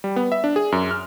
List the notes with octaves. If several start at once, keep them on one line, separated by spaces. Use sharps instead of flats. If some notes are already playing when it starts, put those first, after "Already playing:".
G3
B3
E5
D4
G#4
F#2
F6